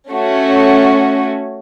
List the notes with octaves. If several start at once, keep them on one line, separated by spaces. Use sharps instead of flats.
A3 C#4 F#4